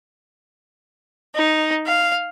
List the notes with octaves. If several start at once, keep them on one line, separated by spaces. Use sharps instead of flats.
D#4
F5